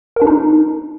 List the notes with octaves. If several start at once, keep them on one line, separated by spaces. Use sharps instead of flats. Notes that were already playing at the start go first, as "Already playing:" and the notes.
A#4
D4
D#4